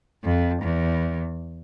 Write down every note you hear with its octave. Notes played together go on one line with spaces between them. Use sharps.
F2
E2